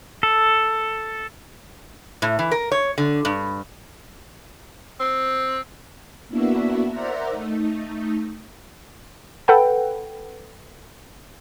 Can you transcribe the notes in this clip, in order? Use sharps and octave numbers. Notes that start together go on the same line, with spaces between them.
A4
A2
E3
A#4
C#5
D3
G2
C4
A#3 B3 D4 E4 F#4 E5
A#4 C5 D5 E5 F#5 A#5
A3 D#4
A4 B4 F#5 G5